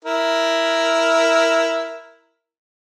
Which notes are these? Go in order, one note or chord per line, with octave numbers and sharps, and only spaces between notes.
E4 A#4